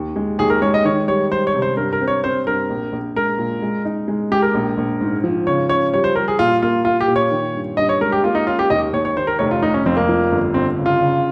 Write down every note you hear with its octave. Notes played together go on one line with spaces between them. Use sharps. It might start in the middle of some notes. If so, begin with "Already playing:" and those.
Already playing: D#2
G#3
D#2 G#4
A#4
G#3 C#5
D#5
D#3 C#5
G3 C#5
G3 C5
C#5
C3
C5
G2 A#4
A#4
C4
C#5
C4 C5
G2 A#4
A#1
A#1
G#3 A#4
A#2
G#3
D#4
G#3
G#3 G4
A#4
A#1
A#1
G#2
F3
C#3 C#5
C#4 C#5
G3 C#5
C5
G3 A#4
G#4
A#2 F4
A#3 F4
A#3 F4
G4
A#2
C#5
D#3
G2
G2 D#5
C#5
G#3 A#4
G4
A#3 F4
D#4
C#4 F4
G4
D#2 D#5
D#2 C#5
C#5
D#3 C5
A#4
F1 C#5
F4
F1 D#4
C#4
F2 C4
A#3
F3
G1
G1 C4
C#3
F4
C#3